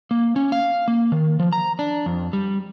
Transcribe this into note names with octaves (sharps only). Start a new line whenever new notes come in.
A#3
C#4
F5
A#3
D#3
F3
A#5
D4
F2
G3